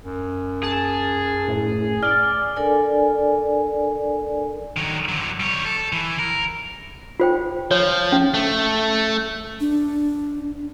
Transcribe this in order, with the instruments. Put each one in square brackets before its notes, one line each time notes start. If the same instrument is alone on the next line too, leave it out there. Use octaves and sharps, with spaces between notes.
[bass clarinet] F#2
[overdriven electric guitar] G#4 [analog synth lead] A5
[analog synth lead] A2
[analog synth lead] D5 [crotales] F6
[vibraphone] D4 A4 A#4 D5 G#5
[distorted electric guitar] D#3 F#3
D3 F#3
G3 C#5
A4
E3
A#4
[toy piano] F4 C5 G5
[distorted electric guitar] F3 [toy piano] C#5
[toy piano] C#4
[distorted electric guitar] A3
[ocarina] D4